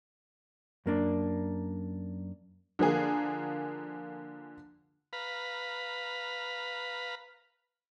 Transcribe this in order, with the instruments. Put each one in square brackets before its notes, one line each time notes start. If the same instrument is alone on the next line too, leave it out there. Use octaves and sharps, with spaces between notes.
[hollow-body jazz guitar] F#2 A#3 D4
[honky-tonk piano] D3 F3 A#3 G#4
[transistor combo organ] B4 F5 A#5 B5